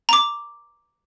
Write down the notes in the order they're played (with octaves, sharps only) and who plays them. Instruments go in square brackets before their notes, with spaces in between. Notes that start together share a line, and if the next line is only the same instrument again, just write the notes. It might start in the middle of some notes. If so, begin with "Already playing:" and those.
[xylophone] A#5 D6